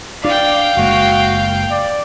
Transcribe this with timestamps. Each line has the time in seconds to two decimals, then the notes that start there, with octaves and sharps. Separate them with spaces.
0.24 D4 D5 F5 G5
0.77 F#1 G#3 A#3 F#4
1.71 D5